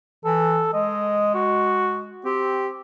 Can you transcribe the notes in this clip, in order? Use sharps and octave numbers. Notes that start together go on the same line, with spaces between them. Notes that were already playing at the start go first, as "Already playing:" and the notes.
E3 A4
G#3 D#5
F#4
C4 G4